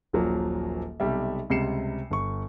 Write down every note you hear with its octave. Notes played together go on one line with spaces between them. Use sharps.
D#1 A#1 F3 F#3 A#3
B1 C3 G3 E5
C#2 C3 G3 C7 C#7 E7
G1 C#6